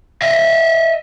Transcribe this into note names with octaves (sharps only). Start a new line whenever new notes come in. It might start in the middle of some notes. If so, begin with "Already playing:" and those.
D#5 E5